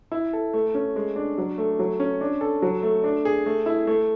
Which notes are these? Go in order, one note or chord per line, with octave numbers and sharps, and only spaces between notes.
E4
A4
A3
C#4
G#3
D4
F#3
A3
F#3
C#4
D4
A4
F#3
A3
D4
G#4
A3
E4
A3